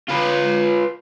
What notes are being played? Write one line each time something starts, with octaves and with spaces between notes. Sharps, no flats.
F4 B4